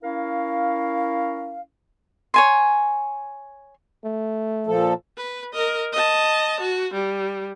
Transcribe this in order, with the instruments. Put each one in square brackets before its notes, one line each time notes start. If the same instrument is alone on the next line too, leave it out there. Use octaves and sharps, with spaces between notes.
[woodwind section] C#4 E4 A#4 F5
[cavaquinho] C#5 G#5 C6
[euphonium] A3
[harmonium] A#2 F3 A4
[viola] B4
A#4 D#5
D#5 A5
F#4
G3